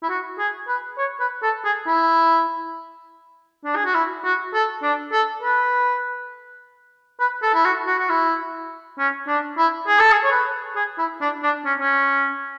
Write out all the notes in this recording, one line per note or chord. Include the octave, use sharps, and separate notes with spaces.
E4
F#4
G#4
B4
C#5
B4
A4
G#4
E4
D4
G#4
F#4
E4
F#4
A4
D4
A4
B4
B4
A4
E4
F#4
F#4
F#4
E4
C#4
D4
E4
G#4
A4
G#4
C#5
B4
G#4
E4
D4
D4
C#4
C#4